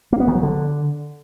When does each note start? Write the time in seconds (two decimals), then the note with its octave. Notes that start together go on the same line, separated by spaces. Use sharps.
0.12 A#3
0.20 B3
0.28 D#3
0.35 F#3
0.43 D3